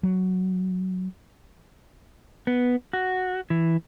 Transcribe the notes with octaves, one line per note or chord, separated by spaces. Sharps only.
F#3
B3
F#4
E3